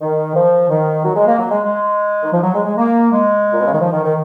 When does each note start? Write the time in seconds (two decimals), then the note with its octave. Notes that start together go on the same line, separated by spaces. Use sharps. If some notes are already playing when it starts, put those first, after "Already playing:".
0.01 D#3
0.35 F3
0.70 D#3
1.05 F#3
1.16 G#3
1.27 A#3
1.39 F#3
1.50 G#3
1.62 G#3
2.23 D#3
2.33 F3
2.43 F#3
2.55 G#3
2.65 G#3
2.78 A#3
3.12 G#3
3.53 A#2
3.60 B2
3.67 C#3
3.73 D#3
3.81 F3
3.92 D#3
4.04 D#3